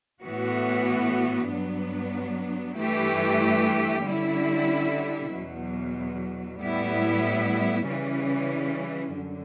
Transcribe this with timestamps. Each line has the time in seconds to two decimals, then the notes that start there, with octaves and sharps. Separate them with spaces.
0.23 A2 E3 B3 F#4
1.51 G2 F#3 B3 D4
2.77 G2 E3 A3 E4 G4
4.05 D3 G3 C#4 E4
5.32 E2 B2 F#3
6.59 A2 G3 B3 E4
7.87 C#3 E3 G3 C#4
9.14 F#2 D3